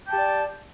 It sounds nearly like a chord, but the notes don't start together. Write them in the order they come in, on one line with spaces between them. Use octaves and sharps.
G5 A5 G4 D5